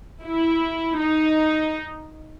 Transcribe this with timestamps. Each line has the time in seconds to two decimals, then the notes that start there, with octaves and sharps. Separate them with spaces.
0.23 E4
0.98 D#4